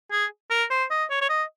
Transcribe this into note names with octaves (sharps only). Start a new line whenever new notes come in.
G#4
A#4
C5
D#5
C#5
C#5
D#5